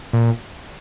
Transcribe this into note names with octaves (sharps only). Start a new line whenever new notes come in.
A#2